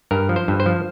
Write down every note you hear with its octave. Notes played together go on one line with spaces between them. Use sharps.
G2 A#4
F3
C5
G2
C5
F3